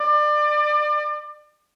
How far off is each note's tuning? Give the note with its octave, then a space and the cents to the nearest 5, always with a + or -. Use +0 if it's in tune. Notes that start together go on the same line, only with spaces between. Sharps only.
D5 +30